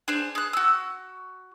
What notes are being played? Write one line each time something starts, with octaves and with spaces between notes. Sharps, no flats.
D4 G#4 C5
G#4 F#6
F#4 E6